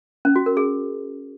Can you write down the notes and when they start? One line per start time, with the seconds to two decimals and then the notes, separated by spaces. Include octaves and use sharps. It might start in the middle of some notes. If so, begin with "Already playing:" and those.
0.25 C#4
0.36 F#4
0.46 A#4
0.57 G#4